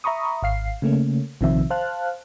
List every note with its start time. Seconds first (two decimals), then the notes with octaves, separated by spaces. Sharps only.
0.04 E5 A#5 B5 C#6 D#6
0.43 G#1 F5 C7
0.82 C#3 A3 A#3 C#4
1.41 A#1 C3 D#3 F3 C4 E5
1.70 C5 F5 A5 F6 F#6